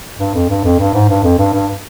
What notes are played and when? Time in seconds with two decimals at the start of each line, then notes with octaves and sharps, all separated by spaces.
0.19 G2
0.34 F2
0.49 G2
0.64 F2
0.79 G2
0.94 G#2
1.09 G2
1.24 F2
1.38 G2
1.53 G2